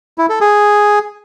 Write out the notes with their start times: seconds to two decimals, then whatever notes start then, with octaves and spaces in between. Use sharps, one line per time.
0.18 E4
0.30 A4
0.41 G#4